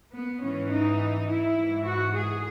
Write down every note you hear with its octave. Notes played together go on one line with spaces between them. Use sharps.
B3
G#2 E3 C#4
D#4
E4
G#2 E3
F#4
G#4